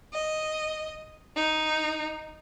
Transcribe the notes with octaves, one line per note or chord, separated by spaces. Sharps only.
D#5
D#4